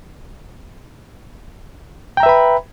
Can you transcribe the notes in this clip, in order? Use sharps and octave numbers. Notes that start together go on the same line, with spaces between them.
B4 E5 G5 A#5 B5